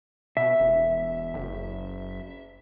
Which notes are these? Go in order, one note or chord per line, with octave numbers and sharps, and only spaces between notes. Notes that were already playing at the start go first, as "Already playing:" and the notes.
B2 E5
E1
F#1